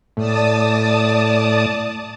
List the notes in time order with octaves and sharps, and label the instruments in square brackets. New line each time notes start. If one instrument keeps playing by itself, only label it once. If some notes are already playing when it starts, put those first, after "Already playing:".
[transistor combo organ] A2 [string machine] D5 A5 D#6